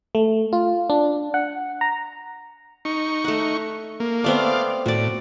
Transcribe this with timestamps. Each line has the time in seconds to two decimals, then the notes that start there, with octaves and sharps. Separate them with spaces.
0.15 A3
0.53 F4
0.90 D4
1.34 F#5
1.81 A#5
2.85 D#4 C#6
3.25 A3 F#5
4.00 A#3
4.24 A3 B3 C4 D5 F5
4.86 A2 F#4 D5